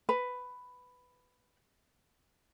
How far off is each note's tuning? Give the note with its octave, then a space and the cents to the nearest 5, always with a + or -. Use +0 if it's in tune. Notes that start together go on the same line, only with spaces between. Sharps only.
B4 +10